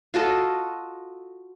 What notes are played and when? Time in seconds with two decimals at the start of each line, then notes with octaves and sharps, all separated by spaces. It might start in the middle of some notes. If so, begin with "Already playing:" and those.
0.14 F4 F#4 A4 D#5